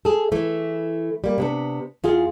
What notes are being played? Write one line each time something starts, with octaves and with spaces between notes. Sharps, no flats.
G#4 A4
E3 A3
G3 A#3
C3 B3 D4
E2 F4 G#4 F5